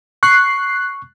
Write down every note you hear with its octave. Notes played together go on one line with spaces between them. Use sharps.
C#6 F#6 C7